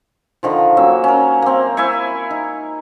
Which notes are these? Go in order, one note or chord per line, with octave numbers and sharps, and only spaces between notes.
D3 D#3 F3
F#3 A#3 C#4 E5
C#4 A#4
A#3 C4
E4 E5 G#5 C#6
D#4